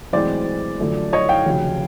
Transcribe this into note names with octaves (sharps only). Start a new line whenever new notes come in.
B1 A2 E3 G#3 C4 C5 D5
F#2 D3 F3 A3
C#5 D#5
F5 G5
F1 D#2 C#3 F#3